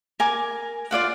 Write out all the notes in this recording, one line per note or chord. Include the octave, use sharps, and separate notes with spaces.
A#4 G#5 D6
F4 D5 F5 F#5